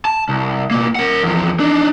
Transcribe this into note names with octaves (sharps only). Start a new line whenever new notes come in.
A5
C2
B2 A#3
A#4 F#5
E2 F3
D4 D#4